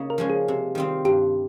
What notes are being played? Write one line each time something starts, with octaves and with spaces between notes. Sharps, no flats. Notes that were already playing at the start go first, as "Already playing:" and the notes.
Already playing: C#3 A#3 D#4
A#4
F3 G#3 C#4
G#4
C3
D#3 G3 C4 F4
G2 G4